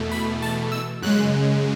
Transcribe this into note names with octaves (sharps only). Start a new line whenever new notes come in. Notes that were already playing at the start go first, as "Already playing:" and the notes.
Already playing: E2 B2 A3
B5
A5
E6
F#2 C#3 G#3 F#6